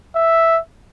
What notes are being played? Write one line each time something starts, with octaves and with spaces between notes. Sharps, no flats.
E5